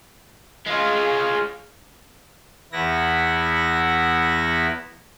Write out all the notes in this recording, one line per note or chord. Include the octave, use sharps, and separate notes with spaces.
G#3 F4 G#4 C#5 F5
E2 B3 E4 A#6